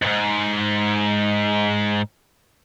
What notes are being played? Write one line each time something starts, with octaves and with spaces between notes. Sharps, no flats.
F2 G#2